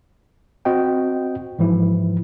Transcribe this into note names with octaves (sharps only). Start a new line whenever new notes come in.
C4 F#4 D#5 G5
G#2 E3 F3 E4